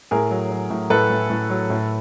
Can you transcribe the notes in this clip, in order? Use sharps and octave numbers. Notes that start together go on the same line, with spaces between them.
A2 G#4 A#4
F#3
F#3
A2
A2 A4 B4
A2
A2
F#3
A2